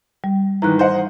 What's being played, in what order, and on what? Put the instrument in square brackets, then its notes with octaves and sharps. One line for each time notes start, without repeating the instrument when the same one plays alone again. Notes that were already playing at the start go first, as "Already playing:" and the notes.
[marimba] G3
[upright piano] G#2 D#3 E3 [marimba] A#5 F#6
[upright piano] C5 D#5 F#5